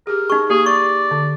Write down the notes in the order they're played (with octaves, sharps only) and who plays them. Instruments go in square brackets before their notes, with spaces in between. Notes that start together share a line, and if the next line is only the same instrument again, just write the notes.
[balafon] G4 G#4 [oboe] A#4
[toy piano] D#4 C#6 [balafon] G#4
[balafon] A#3 [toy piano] G4 [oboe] G#4
[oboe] D5 [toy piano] C#6
[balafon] D3